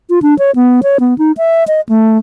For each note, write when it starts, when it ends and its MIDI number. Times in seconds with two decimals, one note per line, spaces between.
0.10 0.19 65
0.22 0.37 62
0.39 0.51 73
0.56 0.81 59
0.83 0.98 73
1.00 1.17 59
1.18 1.32 63
1.37 1.64 76
1.68 1.81 75
1.89 2.18 57